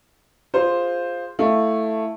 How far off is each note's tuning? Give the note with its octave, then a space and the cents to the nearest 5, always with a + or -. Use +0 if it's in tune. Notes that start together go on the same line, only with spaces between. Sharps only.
F4 +0 G#4 -20 C5 +0
A3 +0 E4 +0 F5 +0